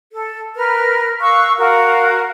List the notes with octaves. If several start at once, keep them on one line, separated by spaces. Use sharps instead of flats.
A4
A#4 B4 F6
F5 C#6 E6 F#6
F#4 A#4 F5